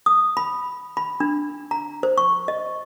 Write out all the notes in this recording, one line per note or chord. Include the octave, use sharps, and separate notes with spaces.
D#6
B5
B5
D4
A#5
C5
C#6
D#5